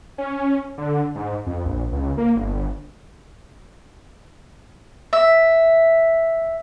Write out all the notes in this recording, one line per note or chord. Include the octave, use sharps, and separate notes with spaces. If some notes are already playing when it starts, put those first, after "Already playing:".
C#4
D3
G#2
F2
A#1
C#2
A#3
G1
G1
E5